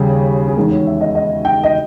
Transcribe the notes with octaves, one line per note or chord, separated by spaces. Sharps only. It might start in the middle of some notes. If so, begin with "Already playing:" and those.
Already playing: D#2 C#3 G3 G#4
G#4
E2 D#3 G#3 A#4
C#5
E5
D#5
D#5
G5
D#5